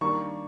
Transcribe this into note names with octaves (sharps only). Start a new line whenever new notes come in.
D#3 G3 A#3 D4 C#6